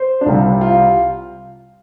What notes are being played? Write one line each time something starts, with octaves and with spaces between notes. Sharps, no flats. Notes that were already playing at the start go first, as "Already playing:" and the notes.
Already playing: C5
D4
C2 C3 G3 F4
F4